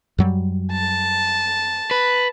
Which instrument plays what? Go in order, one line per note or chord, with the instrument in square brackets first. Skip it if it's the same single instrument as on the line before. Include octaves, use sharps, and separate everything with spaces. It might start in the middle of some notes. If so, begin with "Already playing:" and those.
[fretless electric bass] F#2 F#3 G3
[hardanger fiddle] A5
[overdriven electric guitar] B4